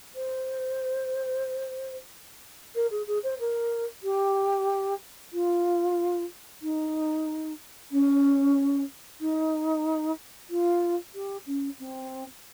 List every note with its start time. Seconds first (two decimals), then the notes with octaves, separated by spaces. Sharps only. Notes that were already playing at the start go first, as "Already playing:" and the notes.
0.15 C5
2.75 A#4
2.90 G#4
3.07 G#4
3.23 C5
3.39 A#4
4.03 G4
5.33 F4
6.62 D#4
7.91 C#4
9.20 D#4
10.50 F4
11.14 G4
11.46 C#4
11.79 C4